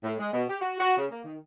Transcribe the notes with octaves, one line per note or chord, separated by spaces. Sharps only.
A2
G#3
B2
G4
F#4
F#4
C#3
A#3
D#3